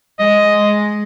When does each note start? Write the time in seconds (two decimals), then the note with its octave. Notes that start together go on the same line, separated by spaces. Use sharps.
0.19 G#3 D#5